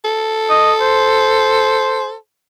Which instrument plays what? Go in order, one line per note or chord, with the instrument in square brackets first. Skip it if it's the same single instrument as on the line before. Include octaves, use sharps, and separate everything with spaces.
[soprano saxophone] A4
[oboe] D#5
C5